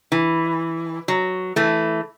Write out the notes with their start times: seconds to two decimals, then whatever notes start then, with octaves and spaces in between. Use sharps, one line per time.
0.12 E3
1.08 F#3
1.56 E3 A3